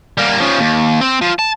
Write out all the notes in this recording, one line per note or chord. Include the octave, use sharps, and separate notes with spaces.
G3 A#3
C#3 F3
D#2
C4
F3
A5